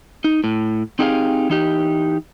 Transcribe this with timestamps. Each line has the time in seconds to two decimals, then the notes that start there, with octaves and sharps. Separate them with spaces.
0.24 D#4
0.44 A2
0.99 C4 D#4 G4 G#4 D#5 F5
1.50 E3 D#4 G4